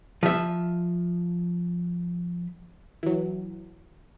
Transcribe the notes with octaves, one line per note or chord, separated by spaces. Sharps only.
F3 E5
E3 F#3